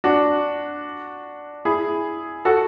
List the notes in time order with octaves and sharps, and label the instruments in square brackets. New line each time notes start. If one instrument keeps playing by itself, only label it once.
[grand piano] D4 F#4
E4 G#4
F#4 A4